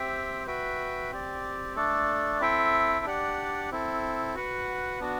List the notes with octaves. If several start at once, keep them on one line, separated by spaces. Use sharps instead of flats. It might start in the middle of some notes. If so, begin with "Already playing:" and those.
Already playing: C4 G4 C5 E5 G5
F#4 B4 E5 G5
C4 G4 D5
A3 D4 A4 D5
C4 E4 A4 E5 G5
D4 G4 D5 F#5
C4 E4 A4
F#4 B4 F#5
B3 D4 F#4